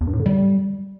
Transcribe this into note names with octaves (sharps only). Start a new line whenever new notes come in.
E2
G2
A2
D3
G3